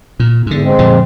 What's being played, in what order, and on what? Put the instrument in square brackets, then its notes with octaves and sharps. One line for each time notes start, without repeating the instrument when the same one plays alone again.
[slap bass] A#2
[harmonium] E2 [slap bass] G#2 D3
[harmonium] G#3 C4
[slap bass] F2 A#2 D3